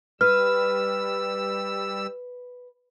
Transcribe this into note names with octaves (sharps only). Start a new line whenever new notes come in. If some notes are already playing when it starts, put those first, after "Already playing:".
G3 B4 E6 F6